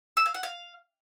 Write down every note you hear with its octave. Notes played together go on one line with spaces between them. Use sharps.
E6
F5
F#5
F5